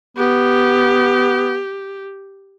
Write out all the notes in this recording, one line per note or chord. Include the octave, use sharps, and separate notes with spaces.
B3 G4